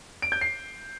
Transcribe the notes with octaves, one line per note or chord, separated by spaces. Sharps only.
D7
G6
C7